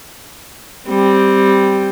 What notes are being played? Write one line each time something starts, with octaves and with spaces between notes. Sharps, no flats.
G3 C4